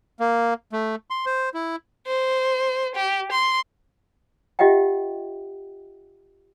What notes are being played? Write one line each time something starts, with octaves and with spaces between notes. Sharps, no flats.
A#3
A3
C6
C5
E4
C5
G4
C6
F4 G4 D#5 E5 F#5 G5